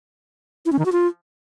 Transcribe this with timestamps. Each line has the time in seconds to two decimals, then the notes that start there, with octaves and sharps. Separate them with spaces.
0.66 E4
0.72 C#4
0.79 D#3
0.86 F#4
0.92 F4